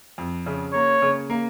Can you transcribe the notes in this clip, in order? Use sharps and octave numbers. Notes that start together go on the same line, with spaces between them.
F2
C#3
A#3 C#5
C#3
A#3